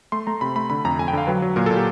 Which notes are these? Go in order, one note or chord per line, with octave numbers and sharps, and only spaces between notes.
A3 C6
A3 A#5
C3 B5
A3 B5
D3 B5
F2 A#5
F2 G#5
G5
D3 F5
F#3 B4
F#3
A#2 A#4
A#2 A4
G4